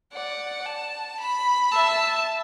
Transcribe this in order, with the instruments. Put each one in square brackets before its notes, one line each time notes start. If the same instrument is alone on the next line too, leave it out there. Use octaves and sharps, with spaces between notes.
[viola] D5 [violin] F#5
[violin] A5
B5
[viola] E5 [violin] A5